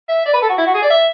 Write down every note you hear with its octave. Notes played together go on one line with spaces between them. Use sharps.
E5
D5
B4
A4
F#4
E4
F#4
G#4
D5
E5